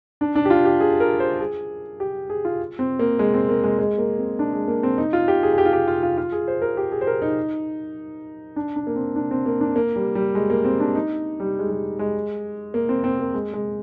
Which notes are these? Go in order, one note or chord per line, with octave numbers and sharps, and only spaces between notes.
D4
D4
G4
F4
G4
G#4
A#4
C5
G#4
G4
G#4
F4
C4
A#3
G#3
C4
A#3
G#3
G#3
A#3
C4
D4
G#3
A#3
C4
D#4
F4
G4
G#4
G#4
G4
F4
G4
F4
F4
F4
G#4
C5
A#4
G4
G#4
C5
A#4
D#4
D4
D4
A#3
C4
D4
C4
A#3
D4
A#3
G3
G3
G#3
A#3
C4
D4
D#4
G3
G#3
G3
G#3
A#3
C4
C4
A#3
G#3
G#3